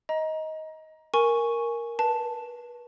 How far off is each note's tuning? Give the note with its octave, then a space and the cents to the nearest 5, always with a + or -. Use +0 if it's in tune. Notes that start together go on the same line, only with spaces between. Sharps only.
D#5 +15 A#5 +20
A#4 +0 G#5 +0 C#6 +0
B4 -30 A5 +0